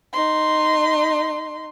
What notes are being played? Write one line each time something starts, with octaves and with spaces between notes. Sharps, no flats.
D#4 C6